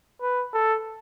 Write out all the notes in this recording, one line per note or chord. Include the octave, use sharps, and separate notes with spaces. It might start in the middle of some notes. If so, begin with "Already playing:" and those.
B4
A4